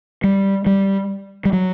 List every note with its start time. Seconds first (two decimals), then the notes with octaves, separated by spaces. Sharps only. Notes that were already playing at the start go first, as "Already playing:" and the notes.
0.24 G3
0.66 G3
1.45 G3
1.53 F#3